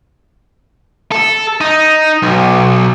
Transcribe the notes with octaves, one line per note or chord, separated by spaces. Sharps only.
A4
D#4
B1